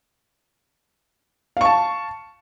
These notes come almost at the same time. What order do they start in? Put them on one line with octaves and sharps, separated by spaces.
F5 C#6 A5